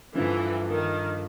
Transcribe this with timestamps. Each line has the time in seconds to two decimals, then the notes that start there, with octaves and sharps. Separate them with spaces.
0.15 G2 D3 E3 F3
0.68 D#3